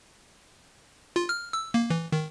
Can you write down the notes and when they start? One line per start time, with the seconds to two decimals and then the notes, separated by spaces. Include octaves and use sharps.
1.16 F4
1.29 F6
1.53 E6
1.74 A#3
1.90 E3
2.12 D#3